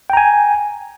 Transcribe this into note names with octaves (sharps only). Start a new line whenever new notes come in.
G5 G#5 A#5